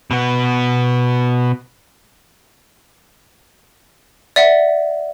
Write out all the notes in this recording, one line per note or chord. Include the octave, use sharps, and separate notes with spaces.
B2 B3
D5 E5 F#5